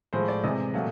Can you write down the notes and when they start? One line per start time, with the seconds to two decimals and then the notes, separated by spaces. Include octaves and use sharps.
0.13 A2 F3 G#3 C5
0.28 D5
0.43 C3 E3 G#3 D#5
0.74 A#2 F#3 A3